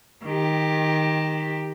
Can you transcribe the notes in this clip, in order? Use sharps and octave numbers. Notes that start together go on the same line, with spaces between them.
D#3 G4